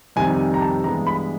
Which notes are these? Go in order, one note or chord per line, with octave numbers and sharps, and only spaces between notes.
F2 C3 D#3 G3 G#5
A#5
A5
G2 E3 G#3 B3 A#5
B5